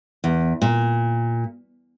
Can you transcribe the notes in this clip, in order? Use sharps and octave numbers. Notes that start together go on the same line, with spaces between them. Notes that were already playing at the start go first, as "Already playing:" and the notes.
E2
A#2